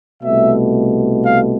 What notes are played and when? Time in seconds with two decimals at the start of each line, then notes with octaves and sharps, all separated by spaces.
0.22 C2 B2 A3 E5
1.24 F5